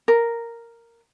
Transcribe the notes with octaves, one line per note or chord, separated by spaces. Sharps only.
A#4